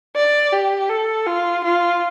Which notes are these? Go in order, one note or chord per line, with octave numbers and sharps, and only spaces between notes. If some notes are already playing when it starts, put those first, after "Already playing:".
D5
G4
A4
F4
F4